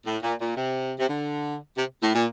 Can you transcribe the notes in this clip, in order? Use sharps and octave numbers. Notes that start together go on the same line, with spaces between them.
A2
A#2
A#2
C3
C3
D3
C3
A2
A#2